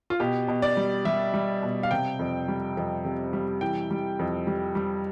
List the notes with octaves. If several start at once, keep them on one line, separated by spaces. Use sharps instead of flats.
F4
B2 G4
B2
D5
G3
G3 E5
G3
B2
F5
C3 G5
F2
G3
F2
C3
G3
E3 G5
G3
F2
G3
G3